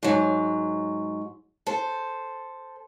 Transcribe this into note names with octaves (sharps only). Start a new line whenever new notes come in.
G#2 F#3
A4 C5